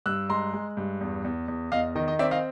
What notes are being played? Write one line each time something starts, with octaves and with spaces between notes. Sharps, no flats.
G2 E6 F#6
G#3 A#5 C6
G#3
G2
E2
E2
E2
E2 D#5 F5
D#3 D#5
D#5
C4 D5 E5
D#5 F5